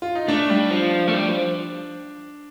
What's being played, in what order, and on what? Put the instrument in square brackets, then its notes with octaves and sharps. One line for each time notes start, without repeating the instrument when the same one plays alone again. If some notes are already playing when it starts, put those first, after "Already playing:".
[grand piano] F4
D#4
[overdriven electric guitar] A3 [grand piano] D4
[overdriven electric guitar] G3
F3
A3
G3
F3